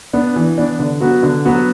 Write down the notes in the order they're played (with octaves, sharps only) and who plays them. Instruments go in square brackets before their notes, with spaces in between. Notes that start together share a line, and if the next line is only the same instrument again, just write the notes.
[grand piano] B3 D4
E3
B3 D4
D3
F#3 B3 F#4
D3
F#3 B3 F#4